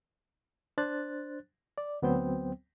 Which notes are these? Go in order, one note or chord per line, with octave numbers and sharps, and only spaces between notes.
D4 C5 F#6 A6
D5
D2 F#3 B3 C4 C5 G5